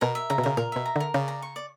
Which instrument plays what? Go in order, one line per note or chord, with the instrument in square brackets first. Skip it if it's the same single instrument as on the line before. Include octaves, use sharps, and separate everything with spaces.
[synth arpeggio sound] B2 [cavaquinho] A#4
[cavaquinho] E5
[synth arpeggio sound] C#3 [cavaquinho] A#5
[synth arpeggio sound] B2
[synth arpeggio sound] C#3 [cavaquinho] A#4
[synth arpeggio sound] A#2 [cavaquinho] A#4
[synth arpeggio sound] B2 [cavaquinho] E5
[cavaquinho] A#5
[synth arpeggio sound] D3
[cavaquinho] A#4
[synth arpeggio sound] C#3 [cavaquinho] D5
[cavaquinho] A#5
C#6
D5